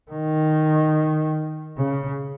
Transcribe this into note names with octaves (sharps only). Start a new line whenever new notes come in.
D#3
C#3